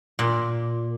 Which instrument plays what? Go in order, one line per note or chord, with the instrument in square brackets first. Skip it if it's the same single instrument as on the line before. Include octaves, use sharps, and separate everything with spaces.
[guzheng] A#2